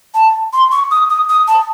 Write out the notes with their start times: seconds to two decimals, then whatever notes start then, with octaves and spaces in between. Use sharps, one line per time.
0.14 A5
0.53 C6
0.71 C#6
0.91 D#6
1.10 D#6
1.29 D#6
1.48 A5